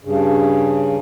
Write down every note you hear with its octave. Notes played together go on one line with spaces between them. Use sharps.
G2 C#3